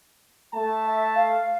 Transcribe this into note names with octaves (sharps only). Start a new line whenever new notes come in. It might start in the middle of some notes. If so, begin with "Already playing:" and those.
A3 A5
E5
F5